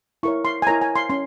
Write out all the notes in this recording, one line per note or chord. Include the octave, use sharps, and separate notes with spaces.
E4 A#4 C#5 C#6
C6
G#5
E4 A#4 C#5 A#5
G#5
C6
C#4 C6